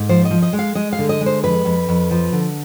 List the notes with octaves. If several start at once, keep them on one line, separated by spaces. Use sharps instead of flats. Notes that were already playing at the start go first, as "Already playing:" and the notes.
Already playing: G#2
F3 C5
D#5
F3
D#5
G#3
F5
G#3 D#5
F5
D3
D#5
G#3
C5
F2 B4
F2
F2
F3
D3